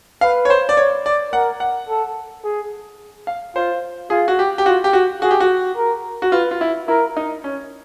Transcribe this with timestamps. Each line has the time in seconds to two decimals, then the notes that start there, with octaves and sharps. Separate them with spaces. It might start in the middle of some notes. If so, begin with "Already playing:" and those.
0.21 B4 F5
0.45 C#5
0.50 C5
0.69 D5
0.77 C#5
1.06 D5
1.33 A#4 F#5
1.60 F#5
1.89 A4
2.44 G#4
3.27 F5
3.56 F4 C5
4.10 F4 G#4
4.28 F#4
4.39 G4
4.58 G4
4.66 F4 F#4
4.84 G4
4.93 F#4
5.22 F#4 G#4
5.31 G4
5.40 F#4
5.77 A#4
6.22 F#4
6.32 F4 B4
6.51 F4
6.61 E4
6.88 E4 A#4
7.17 D#4
7.44 C#4